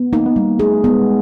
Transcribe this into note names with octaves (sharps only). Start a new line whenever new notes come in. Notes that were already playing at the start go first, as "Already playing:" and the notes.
Already playing: B3
A#3 D#4
B3
G3 A#3
A3 G#4
G#3 B3